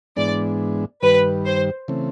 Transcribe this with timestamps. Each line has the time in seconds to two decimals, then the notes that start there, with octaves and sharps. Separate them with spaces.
0.16 G#2 E3 G#3 B3 D4 D5
1.02 G2 D#3 G3 B4
1.45 C5
1.88 C#3 E3 A3 C4